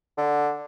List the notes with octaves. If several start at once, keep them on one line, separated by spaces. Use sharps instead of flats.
D3